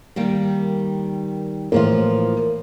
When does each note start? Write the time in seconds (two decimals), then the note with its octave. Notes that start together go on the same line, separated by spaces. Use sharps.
0.16 D#3 G3 A#3
1.72 A2 E3 F3 A#3 F4